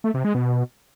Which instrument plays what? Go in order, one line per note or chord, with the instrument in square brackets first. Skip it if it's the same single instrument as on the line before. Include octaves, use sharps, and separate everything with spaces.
[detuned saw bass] A3
C3
G#3
B2